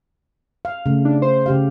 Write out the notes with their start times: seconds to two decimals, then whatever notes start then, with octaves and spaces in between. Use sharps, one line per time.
0.65 F5
0.86 C#3 A3
1.05 D4
1.22 C5
1.46 C#3 G4 F5